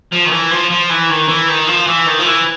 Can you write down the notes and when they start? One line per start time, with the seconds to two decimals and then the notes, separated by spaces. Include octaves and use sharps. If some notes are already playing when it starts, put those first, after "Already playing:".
0.13 F3
0.26 D#3
0.31 E3
0.51 F3
0.70 F3
0.90 E3
1.10 D#3
1.28 E3
1.48 D#3
1.67 F3
1.87 E3
2.07 D#3
2.18 F3
2.25 E3